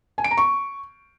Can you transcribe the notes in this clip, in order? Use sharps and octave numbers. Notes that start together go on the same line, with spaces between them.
G#5
D7
A#5
C#6